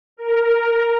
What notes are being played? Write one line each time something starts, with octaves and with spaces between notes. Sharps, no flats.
A#4